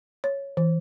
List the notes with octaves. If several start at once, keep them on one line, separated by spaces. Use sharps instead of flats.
C#5
E3